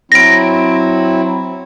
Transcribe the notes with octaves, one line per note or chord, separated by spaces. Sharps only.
F#3 C4 E4 A#6 D7